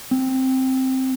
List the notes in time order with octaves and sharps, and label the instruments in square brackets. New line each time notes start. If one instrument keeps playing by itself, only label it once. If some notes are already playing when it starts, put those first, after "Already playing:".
[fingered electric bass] C4